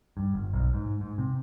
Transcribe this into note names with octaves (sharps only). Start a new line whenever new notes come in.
G2
G1
B1
G#2
G#2
C3